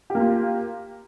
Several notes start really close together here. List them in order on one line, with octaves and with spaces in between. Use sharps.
G4 A#3 F4